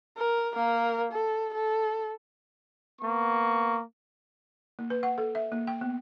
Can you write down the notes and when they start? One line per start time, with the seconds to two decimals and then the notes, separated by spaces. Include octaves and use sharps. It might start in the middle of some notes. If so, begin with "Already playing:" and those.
0.17 A#4
0.54 A#3 A#4
1.12 A4
1.54 A4
3.01 A#3 B3 C#6
4.79 A#3
4.90 B4
5.03 F#5
5.18 A4
5.35 E5
5.52 A#3
5.67 G5
5.81 B3